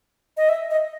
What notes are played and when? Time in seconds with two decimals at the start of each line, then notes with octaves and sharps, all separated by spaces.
0.37 D#5
0.49 E5
0.71 D#5